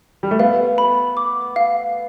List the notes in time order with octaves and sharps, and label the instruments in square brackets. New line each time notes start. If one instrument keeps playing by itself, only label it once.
[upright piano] G3
A3
[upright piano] B3 [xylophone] F5
[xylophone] B5
D6
F5